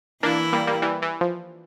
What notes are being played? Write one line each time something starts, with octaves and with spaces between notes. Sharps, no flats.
E3 A#3 D4 E4
G3 A#3
G3 A#3
E3 G3
E3
F3